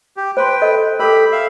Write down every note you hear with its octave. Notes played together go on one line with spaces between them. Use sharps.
G4
B4 C5 G5 C6
A4 D#5
G4 A4 A#4 B5
E5 F5